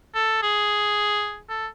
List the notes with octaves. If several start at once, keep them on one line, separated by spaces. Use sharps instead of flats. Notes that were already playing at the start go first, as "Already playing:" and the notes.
A4
G#4
A4